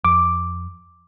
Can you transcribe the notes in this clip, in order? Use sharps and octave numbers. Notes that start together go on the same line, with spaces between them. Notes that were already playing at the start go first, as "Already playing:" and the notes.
F2 D6